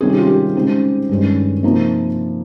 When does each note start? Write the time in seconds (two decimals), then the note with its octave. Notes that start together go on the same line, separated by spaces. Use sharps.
0.01 C3 D#3 G3 C#4 G#4
0.09 G4
0.18 F4
0.27 G4
0.55 C#3 G#3 C4 D#4
1.09 G2 D#3 G#3 C#4
1.63 C3 F3 A#3 D#4